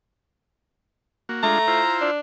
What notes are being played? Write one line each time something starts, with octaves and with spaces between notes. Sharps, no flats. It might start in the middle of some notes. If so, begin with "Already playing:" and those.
A#3 F#4
G#3 A3 D4 F4 A#5
E4 F4 C5
D4